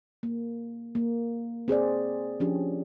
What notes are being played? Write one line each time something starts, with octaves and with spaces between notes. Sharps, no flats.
A#3
A#3
C4 G#4 C5 D5
F3 C#4 D4 G4